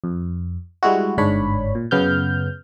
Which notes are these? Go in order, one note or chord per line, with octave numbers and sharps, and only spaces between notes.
F2
G3 G#3 E4 F#4
G1 G#2 D4 C#5 B5
A#2
F#2 C#3 B3 F6 G6